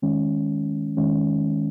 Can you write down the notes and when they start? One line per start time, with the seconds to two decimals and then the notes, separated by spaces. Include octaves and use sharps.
0.02 D#3 G#3 C#4
0.97 D#3 G#3 C#4